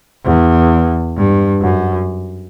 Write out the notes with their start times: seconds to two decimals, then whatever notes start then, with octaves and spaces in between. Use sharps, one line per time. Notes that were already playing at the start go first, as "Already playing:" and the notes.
0.25 E2
1.16 G2
1.61 F#2